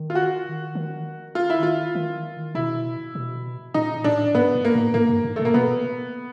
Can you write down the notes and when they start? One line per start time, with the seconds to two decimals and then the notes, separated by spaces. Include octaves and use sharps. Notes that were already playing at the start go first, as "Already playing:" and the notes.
Already playing: D#3
0.10 F4
0.15 F#4
0.75 D#3
1.35 F4
1.50 E4
1.63 F4
1.95 D#3
2.55 B2 E4
3.15 B2
3.74 A#2 D#4
4.04 A2 D4
4.34 G#2 B3
4.55 G#2
4.65 A#3
4.74 A2
4.94 G#2 A#3
5.09 G2
5.24 G#2
5.36 B2 A3
5.45 A#3
5.54 B2 B3